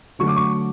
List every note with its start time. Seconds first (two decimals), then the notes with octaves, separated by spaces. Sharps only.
0.19 D3 F#3 A3 C#6
0.28 D6
0.36 C#6